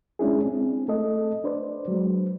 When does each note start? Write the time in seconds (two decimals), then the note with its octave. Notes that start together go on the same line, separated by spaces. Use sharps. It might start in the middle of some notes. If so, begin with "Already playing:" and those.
0.19 G#3 C#4 D4 E4 G#4
0.45 C4
0.88 A3 A4 D#5
1.44 D4 B4 C5 D5
1.88 F#3 G#3